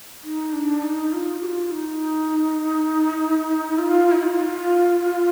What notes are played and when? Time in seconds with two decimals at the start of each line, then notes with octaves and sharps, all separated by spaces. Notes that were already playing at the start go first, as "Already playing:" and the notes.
0.24 D#4
0.53 D4
0.82 D#4
1.13 F4
1.42 G4
1.46 F4
1.71 D#4
3.79 F4
4.12 D#4
4.23 F4